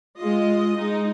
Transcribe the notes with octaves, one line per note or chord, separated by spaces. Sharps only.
G#3 F4 D#5
G#3 D#4